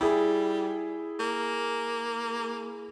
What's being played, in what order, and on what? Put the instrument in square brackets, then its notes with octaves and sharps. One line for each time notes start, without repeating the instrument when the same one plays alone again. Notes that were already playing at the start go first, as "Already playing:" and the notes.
[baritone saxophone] G3 [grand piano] E4 G#4
[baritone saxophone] A#3